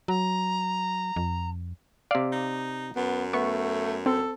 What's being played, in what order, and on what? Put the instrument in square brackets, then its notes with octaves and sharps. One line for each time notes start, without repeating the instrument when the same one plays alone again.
[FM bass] F#3 [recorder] A#5
[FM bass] F2
[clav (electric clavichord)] C3 D5 [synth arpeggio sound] F5
[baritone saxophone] D#4
[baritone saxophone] F#2 [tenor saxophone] B3
[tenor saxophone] A3 [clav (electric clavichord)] B3 [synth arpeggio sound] C#6
[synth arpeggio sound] C4 [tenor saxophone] A4